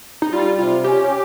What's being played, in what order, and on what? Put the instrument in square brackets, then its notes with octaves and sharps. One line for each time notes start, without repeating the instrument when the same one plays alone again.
[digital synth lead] D#4
[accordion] G3 [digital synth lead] F4
[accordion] C3 [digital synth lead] F4
[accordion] C#4 [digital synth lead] G4
[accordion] G4